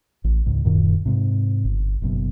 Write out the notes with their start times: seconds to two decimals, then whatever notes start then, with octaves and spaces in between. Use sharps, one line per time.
0.24 A1
0.46 C#2 G#2
0.65 D1 F#2 A#2 D#3
1.06 G#2 C3
1.65 G1
2.02 F#1 F#2 B2